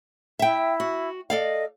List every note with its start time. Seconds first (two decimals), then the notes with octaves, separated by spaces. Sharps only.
0.39 E4 E5 G5
0.80 F#4
1.30 A4 D5 D#5 F5